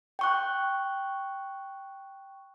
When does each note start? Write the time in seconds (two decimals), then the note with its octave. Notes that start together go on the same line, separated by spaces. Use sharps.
0.19 G5 C#6 F#6